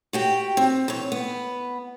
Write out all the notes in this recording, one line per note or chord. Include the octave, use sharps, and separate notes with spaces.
F#4 G4 G5
C4
E2 C#5
B3